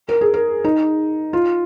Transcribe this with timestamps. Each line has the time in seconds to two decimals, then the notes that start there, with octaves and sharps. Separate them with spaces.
0.09 A#4
0.21 G#4
0.34 A#4
0.64 D#4
1.33 F4